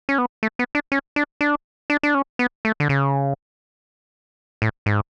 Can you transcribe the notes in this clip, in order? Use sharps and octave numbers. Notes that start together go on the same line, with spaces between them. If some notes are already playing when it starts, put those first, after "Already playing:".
C#4
B3
A3
B3
D4
C#4
D4
D4
D4
D4
C#4
B3
A3
D3
C#3
A2
G#2